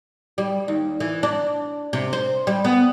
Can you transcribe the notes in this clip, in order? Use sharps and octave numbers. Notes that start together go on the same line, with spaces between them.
G3
D#2
E3
D4
C3
C5
G3
B3